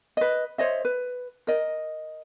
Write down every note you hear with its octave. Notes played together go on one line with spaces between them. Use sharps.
B4 D#5
C5 C#5 D#5 E5
B4
A#4 D#5